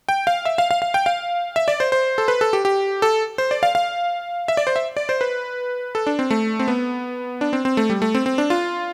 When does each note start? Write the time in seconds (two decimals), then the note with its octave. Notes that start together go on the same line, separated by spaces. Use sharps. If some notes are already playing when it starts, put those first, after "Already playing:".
0.09 G5
0.27 F5
0.45 E5
0.58 F5
0.71 F5
0.82 F5
0.94 G5
1.06 F5
1.56 E5
1.68 D5
1.80 C5
1.92 C5
2.18 A4
2.28 B4
2.41 A4
2.53 G4
2.65 G4
3.02 A4
3.38 C5
3.51 D5
3.63 F5
3.75 F5
4.48 E5
4.57 D5
4.67 C5
4.76 E5
4.97 D5
5.09 C5
5.21 B4
5.95 A4
6.07 D4
6.19 C4
6.31 A3
6.59 C4
6.68 B3
7.41 D4
7.53 C4
7.65 C4
7.77 A3
7.90 G3
8.02 A3
8.15 C4
8.26 C4
8.38 D4
8.50 F4